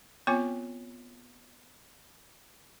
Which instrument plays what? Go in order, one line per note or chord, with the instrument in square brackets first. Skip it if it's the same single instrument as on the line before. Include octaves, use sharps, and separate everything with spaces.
[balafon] B3 C4 F4 C#5 G#5 D6